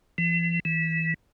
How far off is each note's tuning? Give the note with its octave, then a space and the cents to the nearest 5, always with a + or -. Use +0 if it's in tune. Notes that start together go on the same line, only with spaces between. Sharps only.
E3 +45
E3 -20